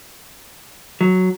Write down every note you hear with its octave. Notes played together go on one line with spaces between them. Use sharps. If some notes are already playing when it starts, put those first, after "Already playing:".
F#3